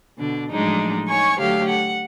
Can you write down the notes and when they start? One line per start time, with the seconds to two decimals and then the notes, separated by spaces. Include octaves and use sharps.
0.17 B2 D3 D4
0.51 A2 F3 F#3 G#3 D4 D#4
1.07 D#4 C#5 G#5 C#6
1.39 D3 F#3 A3 G4 C#5 F5
1.69 F#5